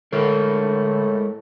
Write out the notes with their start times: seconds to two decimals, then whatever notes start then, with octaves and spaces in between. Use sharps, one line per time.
0.13 A2 D3 G#3 A#4